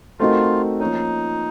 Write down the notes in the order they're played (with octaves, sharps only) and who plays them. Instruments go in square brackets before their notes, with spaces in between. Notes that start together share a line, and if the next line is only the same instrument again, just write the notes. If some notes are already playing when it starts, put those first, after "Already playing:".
[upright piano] A3 C4 D#4 F#4 A#4 [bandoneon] F4
[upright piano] F3 A#3 C#4 [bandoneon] D#4